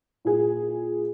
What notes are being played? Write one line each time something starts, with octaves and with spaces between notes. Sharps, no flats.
A#2 G#4